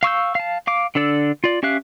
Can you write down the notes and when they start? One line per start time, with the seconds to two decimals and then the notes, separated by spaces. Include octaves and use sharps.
0.03 F5 C#6 E6 G6
0.35 F5 A5
0.67 F5 D6
0.95 D3 D4 A4 D5 E6
1.44 F4 D5
1.63 C#4 G4 E5 F5 F#6